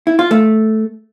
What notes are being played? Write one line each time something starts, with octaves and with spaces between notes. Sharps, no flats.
E4
F4
A3